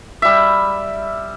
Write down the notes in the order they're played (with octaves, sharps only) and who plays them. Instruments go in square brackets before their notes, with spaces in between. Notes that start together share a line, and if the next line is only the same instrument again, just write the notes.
[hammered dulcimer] G3 E5